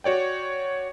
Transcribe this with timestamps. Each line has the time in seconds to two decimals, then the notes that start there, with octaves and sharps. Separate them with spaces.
0.04 F#4 C#5 D5 G5